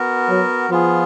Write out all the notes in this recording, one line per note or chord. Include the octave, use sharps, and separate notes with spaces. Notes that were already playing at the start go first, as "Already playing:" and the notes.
Already playing: B3 F#4 A#4
F#3
F3 B3 F4 G#4